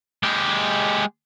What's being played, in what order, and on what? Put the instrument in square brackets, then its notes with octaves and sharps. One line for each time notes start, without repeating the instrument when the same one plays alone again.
[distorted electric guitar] G#3 G4